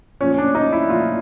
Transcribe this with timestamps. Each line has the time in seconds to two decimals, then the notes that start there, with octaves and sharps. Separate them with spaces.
0.21 A#2 F3 C#4
0.38 D4
0.55 D#4
0.72 E4
0.90 A#2 F3 F4